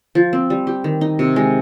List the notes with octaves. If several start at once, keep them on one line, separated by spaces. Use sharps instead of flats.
F3
C4
G3
G4
D#3
D#4
C3
G#3